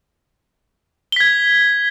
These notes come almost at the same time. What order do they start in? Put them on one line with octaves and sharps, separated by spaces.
G7 B6 G#6